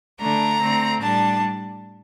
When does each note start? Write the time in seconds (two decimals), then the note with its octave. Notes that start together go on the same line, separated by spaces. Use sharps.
0.20 D3 A3 D4 A#5
0.62 D3 A3 C4
1.02 A2 G3 D4 A5